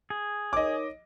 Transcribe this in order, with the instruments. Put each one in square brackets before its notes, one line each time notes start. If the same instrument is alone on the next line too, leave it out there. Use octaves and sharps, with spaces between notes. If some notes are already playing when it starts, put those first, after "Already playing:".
[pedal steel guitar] G#4
[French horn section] D#4 A#4 C#5 [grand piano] D#5 D6